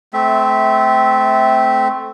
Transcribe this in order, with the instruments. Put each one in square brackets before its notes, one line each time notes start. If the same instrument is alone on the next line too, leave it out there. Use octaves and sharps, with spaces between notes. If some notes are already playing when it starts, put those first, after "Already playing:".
[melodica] A3 C4 E5